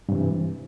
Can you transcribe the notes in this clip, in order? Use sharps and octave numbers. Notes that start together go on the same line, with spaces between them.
G2 C3 E3